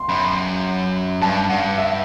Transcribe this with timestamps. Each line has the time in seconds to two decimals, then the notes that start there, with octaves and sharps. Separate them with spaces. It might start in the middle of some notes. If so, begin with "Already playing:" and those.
Already playing: C6
0.09 F#2 B5
1.21 G2 A5
1.49 G2 F#5
1.78 E5